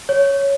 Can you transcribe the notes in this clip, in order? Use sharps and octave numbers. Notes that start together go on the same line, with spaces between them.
C#5